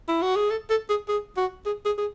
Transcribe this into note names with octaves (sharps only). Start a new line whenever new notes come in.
E4
F#4
G#4
A4
A4
G#4
G#4
F#4
G#4
G#4
G#4